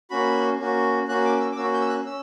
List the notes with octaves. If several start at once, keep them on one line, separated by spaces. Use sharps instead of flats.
A#3 C#4 F#4 B5
A#3 C#4 F#4
A#3 C#4 F#4 F#6
D6
E6
D6
A#3 C#4 F#4 E6
G6
E6
F#6
C#4 E6